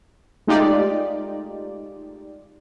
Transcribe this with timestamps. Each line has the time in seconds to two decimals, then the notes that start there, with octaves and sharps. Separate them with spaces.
0.47 G#3 A3 D#4 F4 G4 D5